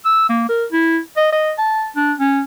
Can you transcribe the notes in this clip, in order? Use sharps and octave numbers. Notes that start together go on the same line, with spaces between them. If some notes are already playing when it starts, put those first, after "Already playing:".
E6
A#3
A#4
E4
D#5
D#5
A5
D4
C#4